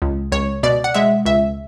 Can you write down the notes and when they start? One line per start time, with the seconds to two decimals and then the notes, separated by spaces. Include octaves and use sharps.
0.02 C#2
0.32 C#2 C#5
0.63 B2 D5
0.84 F#5
0.94 G#3 E5
1.26 C#2 E5